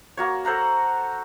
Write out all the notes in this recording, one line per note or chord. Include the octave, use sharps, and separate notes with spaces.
A#3 F#4 C#5
A4 C5 F#5 A#5